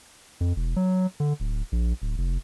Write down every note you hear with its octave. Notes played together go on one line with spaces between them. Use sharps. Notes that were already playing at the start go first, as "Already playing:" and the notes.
F2
E1
F#3
D3
D1
A#1
D1
F1